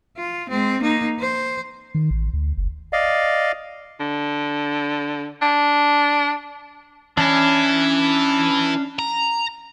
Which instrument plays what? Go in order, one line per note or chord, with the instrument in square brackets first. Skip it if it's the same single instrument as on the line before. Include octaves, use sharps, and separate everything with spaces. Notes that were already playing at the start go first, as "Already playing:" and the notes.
[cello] F4
G#3 C4
A#3 D#4
C5
[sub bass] D#3
A1
D2
F#1
[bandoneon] D5 D#5 F5
[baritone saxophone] D3
D4
[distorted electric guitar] E3 E4 [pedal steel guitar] C#4 D4
[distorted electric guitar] A#5